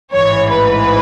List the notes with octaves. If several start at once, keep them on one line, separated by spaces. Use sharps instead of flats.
A1 G#2 E3 C#5
B4